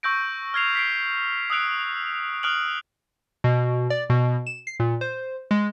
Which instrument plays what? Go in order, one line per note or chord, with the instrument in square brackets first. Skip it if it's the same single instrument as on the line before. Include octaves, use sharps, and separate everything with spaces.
[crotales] C#6 E6 G6 A#6 D7
F6 G#6 C7 F7
B6 C7 D7
D#6 E6 F#6 D7
D#6 F6 F#6 D7 F#7
[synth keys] B2
D5
B2
E7
C7
A#2
C5
G#3